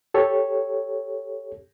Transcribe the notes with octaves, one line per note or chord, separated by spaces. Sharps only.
G4 A4 C#5